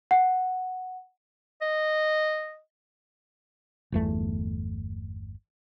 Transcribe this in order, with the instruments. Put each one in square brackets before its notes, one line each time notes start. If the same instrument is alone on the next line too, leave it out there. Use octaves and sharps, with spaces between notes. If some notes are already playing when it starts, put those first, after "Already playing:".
[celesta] F#5
[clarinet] D#5
[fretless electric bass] G1 E2 A3